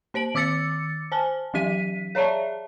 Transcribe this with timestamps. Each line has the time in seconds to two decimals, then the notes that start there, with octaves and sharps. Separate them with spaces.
0.14 A#3 C5 D7 F#7
0.35 D#3 D6 E6 A6 C#7
1.12 C5 G#5 A5
1.54 E3 F#3 G4 B6 D#7
2.15 G#4 C#5 D5 E5 A5